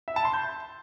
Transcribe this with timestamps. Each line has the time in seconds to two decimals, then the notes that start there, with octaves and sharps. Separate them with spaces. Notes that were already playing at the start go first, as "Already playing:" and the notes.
0.08 E5
0.16 A5
0.25 C6
0.33 G6